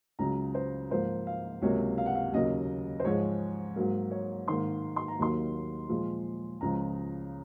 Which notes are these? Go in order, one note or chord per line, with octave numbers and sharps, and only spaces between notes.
C#2 C#3 F#3 A#5
C5
G#2 F3 A#3 C5
F5
C#2 C3 F#3 A#3 C#5
F5
F#5
F5
D#2 C#3 F#3 A#3 D#5
C5
G#2 F3 G#3 C#5
G#2 F#3 A#3
C#5
G#2 D#3 A#3 C6
C6
A#5
D#2 D#3 F#3 A#3 C6
A#2 F3 G#3
C#2 C#3 F3 A#5